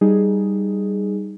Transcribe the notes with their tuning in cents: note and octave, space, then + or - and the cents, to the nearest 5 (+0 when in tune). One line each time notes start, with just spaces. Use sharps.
G3 +0 D#4 +0 G#4 +0